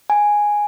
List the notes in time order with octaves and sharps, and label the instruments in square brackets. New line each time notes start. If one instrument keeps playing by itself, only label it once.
[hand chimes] G#5